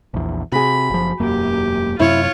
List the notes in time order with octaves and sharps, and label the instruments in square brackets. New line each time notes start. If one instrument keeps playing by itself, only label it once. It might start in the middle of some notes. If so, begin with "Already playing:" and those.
[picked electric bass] A#1 E2
[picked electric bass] C3 [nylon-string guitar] F#4 G#4 [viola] B5
[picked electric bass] F#1 F3
[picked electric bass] E1 F#2 A#3 [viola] G4
[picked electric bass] F#2 C3 [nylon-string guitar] E4 [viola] F4 C#5